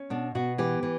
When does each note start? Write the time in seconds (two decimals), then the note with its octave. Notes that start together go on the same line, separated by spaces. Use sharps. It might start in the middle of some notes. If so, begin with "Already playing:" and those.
Already playing: C#4
0.10 B2 D4
0.35 B2 F#4
0.58 E3 G4
0.83 E3